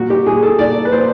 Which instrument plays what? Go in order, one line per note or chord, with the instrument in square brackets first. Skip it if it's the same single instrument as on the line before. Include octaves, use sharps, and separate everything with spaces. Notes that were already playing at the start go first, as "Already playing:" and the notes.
Already playing: [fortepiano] A#2 F#4
G4
A#2 G#4
A4
A#2 D5
B4
A#2 C5